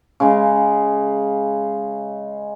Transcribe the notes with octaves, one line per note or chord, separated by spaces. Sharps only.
C#3 G#3